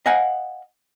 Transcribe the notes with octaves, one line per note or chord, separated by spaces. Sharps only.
D#5 F5 F#5 G#5